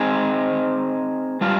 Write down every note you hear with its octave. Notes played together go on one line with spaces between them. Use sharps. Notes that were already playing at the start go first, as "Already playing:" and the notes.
Already playing: C4 D#4 G#4 C5 D#5
G3 D4 F4